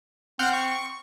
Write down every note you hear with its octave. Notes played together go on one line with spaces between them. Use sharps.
C4 F#5 F6 G6
C#6